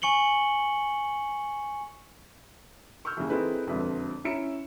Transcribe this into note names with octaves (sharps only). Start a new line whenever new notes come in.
G#5 C#6 C#7 F#7 G7
C#6 E6 F6 G6
D#2 C#3 E3
C4 D#4 E4 G#4 A4 B4
E1 F2 D3 F3 B4 E5
C#4 E4 E5 A#5 C#7 E7